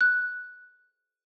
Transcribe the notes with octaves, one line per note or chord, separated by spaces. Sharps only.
F#6